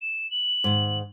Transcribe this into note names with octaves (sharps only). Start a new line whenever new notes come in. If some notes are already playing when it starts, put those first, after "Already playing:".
E7
F#7
G#2 D#3